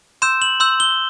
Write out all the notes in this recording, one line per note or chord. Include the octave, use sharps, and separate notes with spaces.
C6 E6 G6 E7
F#7
C6 E6 G6
G7